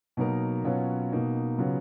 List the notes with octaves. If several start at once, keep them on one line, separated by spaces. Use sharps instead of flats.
B2 F#3 A#3 D#4 A#4
B2 F#3 C#4 F4 B4
B2 A#3 D#4
C#3 F#3 B3 F4